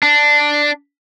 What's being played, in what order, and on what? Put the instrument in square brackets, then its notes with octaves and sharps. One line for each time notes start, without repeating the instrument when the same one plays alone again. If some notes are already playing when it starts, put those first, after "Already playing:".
[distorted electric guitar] D4